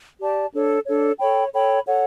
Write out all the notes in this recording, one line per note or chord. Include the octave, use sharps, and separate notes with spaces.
G4 D5 A5
D4 A4 C#5
D4 A4 C#5
A4 C#5 G5 B5
A4 C#5 G5 B5
A4 C#5 F#5